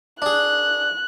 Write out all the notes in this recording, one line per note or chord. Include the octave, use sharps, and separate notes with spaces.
D4 G#4 F#6